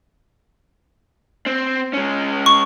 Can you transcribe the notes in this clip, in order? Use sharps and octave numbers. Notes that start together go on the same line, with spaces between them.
C4
G#3 C#4
C#6